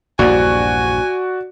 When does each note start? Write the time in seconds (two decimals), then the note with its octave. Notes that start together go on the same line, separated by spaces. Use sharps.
0.19 A#1 E2 G2 F#4 D5 G#5